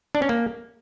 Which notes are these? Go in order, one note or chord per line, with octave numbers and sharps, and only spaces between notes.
D4
C#4
A#3